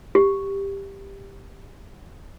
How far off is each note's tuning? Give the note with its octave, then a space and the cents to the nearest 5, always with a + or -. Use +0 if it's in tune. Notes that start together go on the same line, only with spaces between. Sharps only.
G4 +10